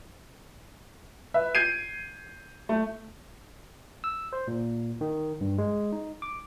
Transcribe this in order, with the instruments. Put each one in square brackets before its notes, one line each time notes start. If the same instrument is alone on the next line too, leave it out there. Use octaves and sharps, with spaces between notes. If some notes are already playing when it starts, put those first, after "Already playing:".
[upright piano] B4 E5
G6 G#6 C7 D7 D#7
A3
[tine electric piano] E6
C5
A#2
D#3
G2
G#3
D#4
D6